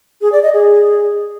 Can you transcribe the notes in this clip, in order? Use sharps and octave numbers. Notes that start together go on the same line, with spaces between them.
G#4
D5
D#5
G#4